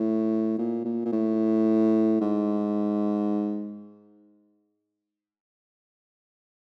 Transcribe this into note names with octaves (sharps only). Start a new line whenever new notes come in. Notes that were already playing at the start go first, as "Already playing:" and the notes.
Already playing: A2
A#2
A#2
A#2
A2
G#2